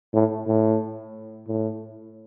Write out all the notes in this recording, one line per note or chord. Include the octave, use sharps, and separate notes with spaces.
A2
A2
A2